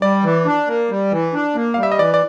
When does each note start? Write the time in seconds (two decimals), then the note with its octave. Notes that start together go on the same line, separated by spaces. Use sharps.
0.02 G3 D5
0.24 E3
0.46 D4
0.68 A#3
0.90 G3
1.12 E3
1.33 D4
1.55 A#3
1.74 F5
1.77 G3
1.83 E5
1.92 D#5
1.99 E3 D5
2.14 D5